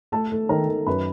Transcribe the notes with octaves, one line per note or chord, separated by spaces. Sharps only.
A3 A4 A5
A3
D#3 A#4 A#5
D#3
F#2 B4 B5